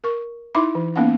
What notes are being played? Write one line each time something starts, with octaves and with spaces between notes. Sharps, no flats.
A#4 C#6
D#4 E4 E5 C6 D6
E3
A#3 B3 C#4 D#4 F#5